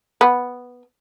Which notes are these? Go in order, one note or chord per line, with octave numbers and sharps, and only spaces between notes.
B3